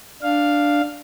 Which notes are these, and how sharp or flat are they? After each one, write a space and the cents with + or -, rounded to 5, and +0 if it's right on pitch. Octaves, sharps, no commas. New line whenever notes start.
D4 +0 F5 +0